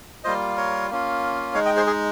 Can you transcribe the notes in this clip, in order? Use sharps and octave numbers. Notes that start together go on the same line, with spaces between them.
G3 A#3 F4 C5 D#5
A#4 C#5
A#3 C#4 F4
G#3 D#4 C#5 F5
D#5 G5
G#4 C5
G#4